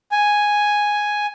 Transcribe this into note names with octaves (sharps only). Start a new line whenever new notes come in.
G#5